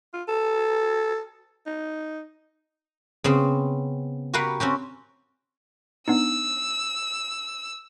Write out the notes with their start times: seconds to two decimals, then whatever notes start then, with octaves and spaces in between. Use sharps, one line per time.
0.14 F4
0.28 A4
1.66 D#4
3.24 C#3 B3 C4
4.33 F#4 G4 A#4 B4 F5 F#5
4.60 C4 C#4 F#4 G4
6.08 B3 D4 D#4 E6